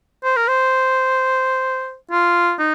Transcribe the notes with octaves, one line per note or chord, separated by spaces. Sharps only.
C5
A#4
C5
F4
D#4